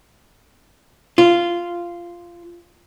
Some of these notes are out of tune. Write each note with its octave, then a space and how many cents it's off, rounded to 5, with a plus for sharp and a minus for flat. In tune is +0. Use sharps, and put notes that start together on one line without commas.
F4 -10